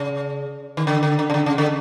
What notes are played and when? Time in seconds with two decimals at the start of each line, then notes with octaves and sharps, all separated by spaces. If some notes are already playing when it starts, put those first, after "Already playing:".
Already playing: C#3
0.77 D#3
0.87 D3
1.03 D3
1.19 D3
1.30 C#3
1.34 D3
1.46 C#3
1.58 D3